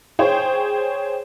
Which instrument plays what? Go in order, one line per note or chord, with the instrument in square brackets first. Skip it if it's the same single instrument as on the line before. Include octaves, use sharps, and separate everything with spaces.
[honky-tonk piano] G#4 C5 C#5 G5